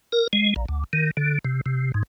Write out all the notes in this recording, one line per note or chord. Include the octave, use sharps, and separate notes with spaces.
A#4
G#3
A#1
D2
D#3
D3
C3
C3
G#2